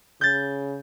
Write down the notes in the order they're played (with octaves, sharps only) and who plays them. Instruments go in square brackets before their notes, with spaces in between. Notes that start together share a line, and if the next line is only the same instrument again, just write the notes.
[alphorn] C#3 [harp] G6 A6